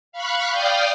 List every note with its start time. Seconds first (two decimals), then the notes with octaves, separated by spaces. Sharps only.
0.12 F5 B5 C#6 F#6
0.50 D5 F5 G5 D#6 F6 G6